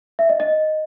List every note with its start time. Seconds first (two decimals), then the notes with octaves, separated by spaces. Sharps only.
0.19 E5
0.29 D#5
0.40 D#5